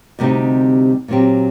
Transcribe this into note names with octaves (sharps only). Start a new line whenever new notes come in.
D2 C3 G3 C4 D#4
A#2 F#3 C4 G4